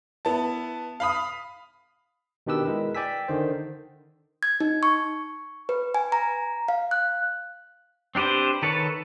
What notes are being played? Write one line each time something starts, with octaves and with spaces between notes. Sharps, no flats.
B3 E4 A5
F5 B5 D#6
B2 D#3 D4 G4 B4 E6
G#3 E4 A#4 B4
D5 G5 G#5 E6 B6
D3 D#3 C5
G#6
D#4
C#6
B4
G#5
A#5
F5
F#6
C4 D4 G4 B4 C5
D#3 A4 B4 C#5 A5